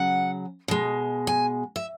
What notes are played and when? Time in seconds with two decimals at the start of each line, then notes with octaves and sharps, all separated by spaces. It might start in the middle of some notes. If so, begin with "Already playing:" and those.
Already playing: C#3 F#3 F#5
0.68 B2 G#3
1.27 G#5
1.76 E5